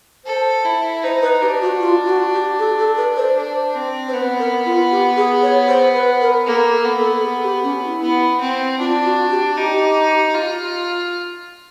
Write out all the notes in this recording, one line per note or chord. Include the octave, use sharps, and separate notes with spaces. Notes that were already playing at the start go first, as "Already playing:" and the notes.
A4 C5
E4
D#4 C5
B4
D4 G4
F#4
F4
F#4
G4
A4
A4
B4
C5
D4 C5
C4
C5
B3 B4
A#4
F4
G4
G#4
C#5
C5
B4
A#4
A#3 A4
A4
B3
A4
G#4
G4
C#4
E4
B3
C4
D4 F4
F#4
G4
D#4 G4
F4